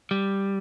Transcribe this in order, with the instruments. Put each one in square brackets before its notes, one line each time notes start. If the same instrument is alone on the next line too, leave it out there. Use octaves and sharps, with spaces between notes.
[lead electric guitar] G3